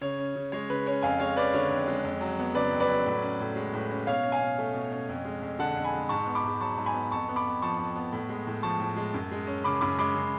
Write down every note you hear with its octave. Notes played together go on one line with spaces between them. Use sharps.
C#3 C#5
C#4
C#3
G#3 C#5
C#3 B4
C#4 C#5
F2 F5 G#5
G#3 C#5 F5
C#4 B4 D5
D3 C#5
F2
G#3
F2
F#3
B3
C#3 B4 D5
F2
B4 D5
F#3
A2
C#4
A2
G#3
A2
C#4
B2 C#5 F5
C#4
F5 G#5
B2
A3
B2
C#4
F2
G#3
F2
D3 F#5 A5
F2
G#5 B5
G#3
G#2 A5 C#6
B3
B5 D6
G#2
F#3 A5 C#6
G#2
G#5 B5
B3
F2 A5 C#6
B3
B5 D6
F2
F3 A5 C#6
F2
B3
A2
G#3
A2
F3 A5 C#6
A2
G#3
F#2
G#3
C#4
C#3 B5 D6
F#2 B5 D6
G#3 B5 D6
C#3